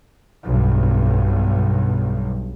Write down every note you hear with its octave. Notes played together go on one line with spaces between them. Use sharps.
B1 G2